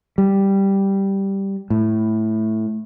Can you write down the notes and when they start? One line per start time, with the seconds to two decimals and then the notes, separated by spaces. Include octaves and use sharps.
0.18 G3
1.70 A2